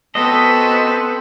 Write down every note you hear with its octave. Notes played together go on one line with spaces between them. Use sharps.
B3 C4 F#4 A4 C5 D#5